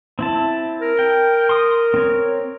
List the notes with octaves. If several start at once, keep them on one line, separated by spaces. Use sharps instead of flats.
C4 E4 A5
A#4
G5
C6 D#6
C4 C#5